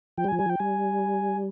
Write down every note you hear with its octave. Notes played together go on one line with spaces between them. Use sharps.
F3 G5
G3
G#5
F3
G3 G#5
F3 G5
G3 G#5